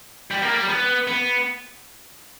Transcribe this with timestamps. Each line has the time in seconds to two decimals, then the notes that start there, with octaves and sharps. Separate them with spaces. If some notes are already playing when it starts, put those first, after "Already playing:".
0.31 G3
0.42 A#3
0.54 G3
0.69 B3
1.07 B3